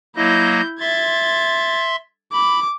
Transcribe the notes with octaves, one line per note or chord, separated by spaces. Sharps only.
F#3 A#3 E4 D#5 G6
E5 C6 G#6 A6
B5 D6